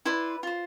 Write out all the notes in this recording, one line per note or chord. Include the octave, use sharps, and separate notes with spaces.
E4 B4 D5 C6
F4 C5